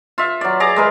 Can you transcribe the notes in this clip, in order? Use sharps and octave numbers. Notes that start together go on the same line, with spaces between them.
F4 E5
F#3 D5
G#4 D5 A#5
G#3 A#4 B4